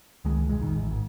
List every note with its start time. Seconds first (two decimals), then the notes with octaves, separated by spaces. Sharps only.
0.25 C#2 D#3 G#3
0.49 E1 C2 G#3
0.62 F1 A#1 D#3
0.75 A1
0.91 G#1